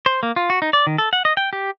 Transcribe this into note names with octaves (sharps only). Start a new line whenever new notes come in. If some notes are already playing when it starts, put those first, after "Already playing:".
C5
A#3
F4
F#4
D#4
D5
D#3
A4
F#5
D#5
G5
G4